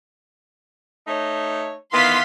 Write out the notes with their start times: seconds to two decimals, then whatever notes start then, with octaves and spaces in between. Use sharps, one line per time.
1.08 A3 D#4 C#5
1.94 D#3 E3 B3 F5 C6 B6